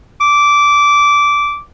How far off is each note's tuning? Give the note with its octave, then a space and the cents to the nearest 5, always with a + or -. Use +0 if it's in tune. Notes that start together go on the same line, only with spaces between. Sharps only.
D6 -15